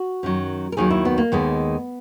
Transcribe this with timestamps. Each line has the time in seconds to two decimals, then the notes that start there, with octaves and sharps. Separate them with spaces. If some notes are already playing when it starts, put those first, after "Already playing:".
Already playing: F#4
0.23 F#2 D#3 F#3
0.72 A#4
0.77 D#2 D#3 F#3 G#4
0.91 E4
1.05 B3
1.18 A#3
1.32 D#2 D#3 G#3 B3